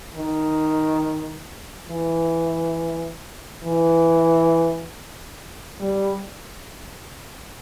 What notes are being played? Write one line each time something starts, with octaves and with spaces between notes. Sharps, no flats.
D#3
E3
E3
G3